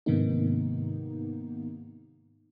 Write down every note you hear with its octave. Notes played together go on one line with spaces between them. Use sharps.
G#2 C3 D#3 A#3 B3 D#4